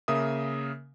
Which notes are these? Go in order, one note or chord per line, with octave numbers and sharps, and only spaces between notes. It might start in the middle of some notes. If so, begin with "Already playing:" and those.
C#3 A#3 A#4 E5 D#6